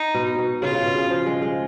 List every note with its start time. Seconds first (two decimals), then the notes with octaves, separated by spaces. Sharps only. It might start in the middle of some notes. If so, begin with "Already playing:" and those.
Already playing: D#4
0.14 B2
0.38 B2
0.62 C#3 F4
0.75 C#3
0.86 B2
0.98 C#3
1.10 F3
1.26 G#3
1.42 G#3